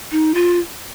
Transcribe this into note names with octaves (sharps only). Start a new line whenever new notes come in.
D#4
F4